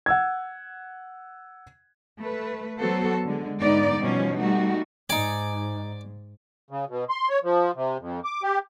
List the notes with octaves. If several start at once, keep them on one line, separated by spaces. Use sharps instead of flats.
F#5 E6 G#6
A3 B4
F#3 B3 F#4 A4 C5
D3 G#3
G#2 D3 B3 D#4 D5
B2 F3 G3 C#4
G3 A3 D#4 F#4
G#2 D#4 D5 G#5
C#3
B2
C6
C#5
F3
C3
F2
D6
G4